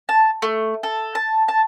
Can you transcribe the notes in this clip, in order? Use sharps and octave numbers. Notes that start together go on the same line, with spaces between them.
A5
A3
A4
A5
A5